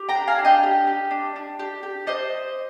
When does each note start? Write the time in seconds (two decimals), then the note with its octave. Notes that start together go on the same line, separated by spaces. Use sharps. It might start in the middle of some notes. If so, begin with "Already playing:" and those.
Already playing: G4
0.09 G5 A#5
0.15 D4
0.27 F5 G#5
0.39 D4
0.45 D#5 G5
0.63 G4
0.87 G4
1.11 D4
1.36 D4
1.59 G4
1.83 G4
2.07 D4 C5 D#5